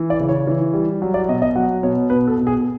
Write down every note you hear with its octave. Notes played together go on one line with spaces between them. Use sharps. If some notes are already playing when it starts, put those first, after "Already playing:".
Already playing: E3
D5
C#3
C#5
E3
G3
F#3
D5
B2 D#5
D#5
F#3 F#5
B2 C#5
B2 B4
A4
B2
G#4